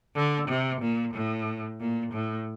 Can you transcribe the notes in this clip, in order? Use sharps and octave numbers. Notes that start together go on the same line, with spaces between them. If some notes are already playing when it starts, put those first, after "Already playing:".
D3
C3
A#2
A2
A#2
A2